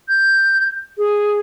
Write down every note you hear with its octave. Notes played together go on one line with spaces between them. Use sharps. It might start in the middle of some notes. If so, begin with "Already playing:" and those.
G6
G#4